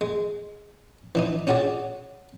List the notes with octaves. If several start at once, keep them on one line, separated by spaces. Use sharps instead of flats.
G#3
E3 D4 D#4
C#4 D4 F#4 G#4 D5